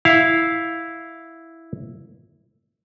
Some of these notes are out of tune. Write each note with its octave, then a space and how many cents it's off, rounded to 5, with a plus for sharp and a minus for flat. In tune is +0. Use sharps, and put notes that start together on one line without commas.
E4 +0 F5 +0